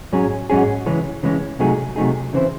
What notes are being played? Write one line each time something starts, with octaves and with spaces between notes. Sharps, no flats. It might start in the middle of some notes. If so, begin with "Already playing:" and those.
G#2 F#3 C#4 G#4
G#2 F#3 C#4 G#4
C#3 E3 G#3 C#4
C#3 E3 G#3 C#4
C3 F#3 A3 D#4 G#4
C3 F#3 A3 D#4 G#4
C#3 E3 C4 E4 C5